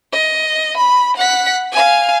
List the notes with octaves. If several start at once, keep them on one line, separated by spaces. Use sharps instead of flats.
D#5
B5
F#5 B6
F5 G#5